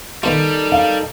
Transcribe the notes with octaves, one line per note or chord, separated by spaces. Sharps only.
D#3 G3 B3 D#4 F4 A4 A#4
F5